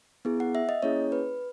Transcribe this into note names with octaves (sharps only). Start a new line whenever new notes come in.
B3 E4 G#4
F#5
E5
D#5
A#3 C#4 E4 G#4 C#5
B4